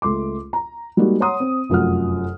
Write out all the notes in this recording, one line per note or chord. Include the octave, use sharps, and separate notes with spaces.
C#2 A3 C6 D6
A#5
G3 G#3 A#3 D#4 F#4
C#5 F#5 A#5 C6 D#6
C4
F1 F#2 F4 F#4 F#5 F6